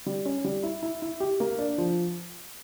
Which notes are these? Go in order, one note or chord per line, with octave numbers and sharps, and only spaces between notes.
G3
C#4
G3
E4
E4
E4
G4
A#3
D4
F3